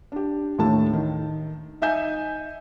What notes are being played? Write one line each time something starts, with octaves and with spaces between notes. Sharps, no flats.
D4 G4
D#2 A2 A3 D4 A5
D#3
D#4 E5 G#5 G6 E7